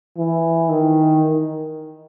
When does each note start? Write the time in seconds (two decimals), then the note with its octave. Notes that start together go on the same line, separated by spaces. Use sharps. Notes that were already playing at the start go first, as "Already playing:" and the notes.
0.17 E3
0.69 D#3